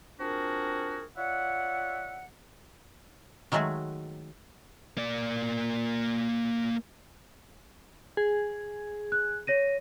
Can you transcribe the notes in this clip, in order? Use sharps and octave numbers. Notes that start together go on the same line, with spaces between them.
C4 D4 F4 F#4 G#4 A#4
F4 C#5 D5 E5 F#5
D#3 F#3 G#3 A3 F#4 G#4
A#3 D5
G#4
F#6
C#5 A#6 D#7